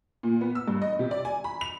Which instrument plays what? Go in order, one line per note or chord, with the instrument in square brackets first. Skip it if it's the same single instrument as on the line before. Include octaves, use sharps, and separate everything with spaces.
[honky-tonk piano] A#2
B3
E6
G2
D#5
C3
D5
G#5
B5
F7